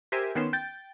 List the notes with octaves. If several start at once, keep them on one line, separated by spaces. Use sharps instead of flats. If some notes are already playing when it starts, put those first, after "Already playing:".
G4 A#4 C5 E5 G#5
D#3 B3 C#4 C6 E7
G5 G6 A6